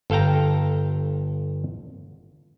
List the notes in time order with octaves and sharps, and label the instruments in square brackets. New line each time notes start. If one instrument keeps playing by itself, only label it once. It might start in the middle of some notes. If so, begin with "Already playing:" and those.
[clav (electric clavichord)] G1 A4 F5 G5 A#5